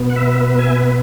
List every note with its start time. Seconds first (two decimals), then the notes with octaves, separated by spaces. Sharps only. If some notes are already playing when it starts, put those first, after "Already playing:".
Already playing: B2 B3
0.10 F#5
0.16 B4 E5
0.41 B4
0.59 E5 G#5
0.76 B4